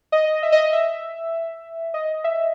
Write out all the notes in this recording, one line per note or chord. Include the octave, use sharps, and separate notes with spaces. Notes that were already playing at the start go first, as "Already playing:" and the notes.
D#5
E5
D#5
E5
D#5
E5